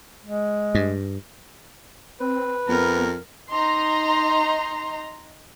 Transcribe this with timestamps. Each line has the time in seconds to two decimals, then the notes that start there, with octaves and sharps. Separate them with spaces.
0.24 G#3
0.75 G2
2.20 C4 B4
2.69 F2 B3 A#4
3.52 D#4 A#5 C6